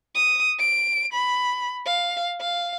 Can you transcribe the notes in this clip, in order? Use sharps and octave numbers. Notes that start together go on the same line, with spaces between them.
D#6
D7
B5
F5
F5